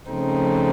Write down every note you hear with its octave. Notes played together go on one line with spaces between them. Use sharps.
C#3 F3 A3 C4 D#4